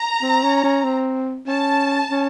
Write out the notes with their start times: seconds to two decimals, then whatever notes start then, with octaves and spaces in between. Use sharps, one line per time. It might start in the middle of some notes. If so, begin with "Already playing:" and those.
Already playing: A#5
0.22 C4
0.43 C#4
0.64 C#4
0.84 C4
1.47 C#4 A5
2.11 C#4